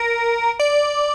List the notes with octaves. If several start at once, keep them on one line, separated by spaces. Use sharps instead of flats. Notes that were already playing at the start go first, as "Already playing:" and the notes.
Already playing: A#4
D5